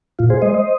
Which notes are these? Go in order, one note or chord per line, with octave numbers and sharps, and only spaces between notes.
A#2 F4
G#4 C5
G#3 C5 D#5
C5 D#5